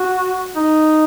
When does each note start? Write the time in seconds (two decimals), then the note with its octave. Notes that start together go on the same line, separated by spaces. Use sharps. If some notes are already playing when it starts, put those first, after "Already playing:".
Already playing: F#4
0.56 D#4